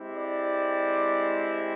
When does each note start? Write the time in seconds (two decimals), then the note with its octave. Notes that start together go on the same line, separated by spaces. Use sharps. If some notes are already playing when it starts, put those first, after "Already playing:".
Already playing: G#3 C4 E4 G4
0.14 D5